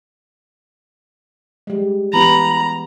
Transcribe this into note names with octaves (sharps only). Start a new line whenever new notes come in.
G3 G#3
E3 B3 G4 A#5 B5